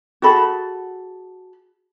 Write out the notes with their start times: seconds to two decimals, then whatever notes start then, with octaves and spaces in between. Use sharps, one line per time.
0.22 F#4 G#4 A4 B5